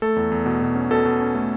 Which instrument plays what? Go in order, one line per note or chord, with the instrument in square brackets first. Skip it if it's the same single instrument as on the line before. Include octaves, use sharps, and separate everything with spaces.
[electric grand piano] A3 A4
E2
E2
B2
B2
C#4
B2 A4
B2
C#4
A3